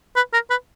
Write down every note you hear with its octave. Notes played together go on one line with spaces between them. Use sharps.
B4
A#4
B4